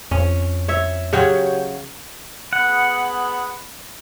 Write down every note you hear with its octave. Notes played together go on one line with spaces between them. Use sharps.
F2 C#4
C#5 E5
C#3 F#3 F#4 G4 C#5
B3 G#4 F#5 B5